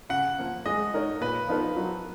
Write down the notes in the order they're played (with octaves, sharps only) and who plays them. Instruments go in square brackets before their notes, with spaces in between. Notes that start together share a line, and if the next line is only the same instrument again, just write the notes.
[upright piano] C#3 [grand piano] F#5
[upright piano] F3 A#3
[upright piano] G#3 [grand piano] D#5
[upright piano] D#4 A#4 C#5
[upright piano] A#2 [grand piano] B4
[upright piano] F3 B3 D#4 A#4
F#3